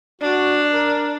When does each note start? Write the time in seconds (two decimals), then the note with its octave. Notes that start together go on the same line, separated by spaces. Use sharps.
0.22 D4 F#4
0.70 A#4